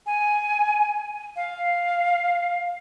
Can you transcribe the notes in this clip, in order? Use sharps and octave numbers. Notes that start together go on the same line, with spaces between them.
G#5
F5